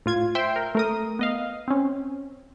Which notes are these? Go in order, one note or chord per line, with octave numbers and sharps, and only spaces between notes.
A2 F4 G#6
C5 E5 G5 C6
A#4
A3 A#4 D#6
B3 D#5 F5
C4 C#4